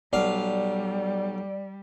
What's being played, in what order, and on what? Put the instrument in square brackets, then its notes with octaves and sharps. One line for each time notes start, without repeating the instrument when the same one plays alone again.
[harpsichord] B1 F5 [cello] G3 [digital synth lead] D5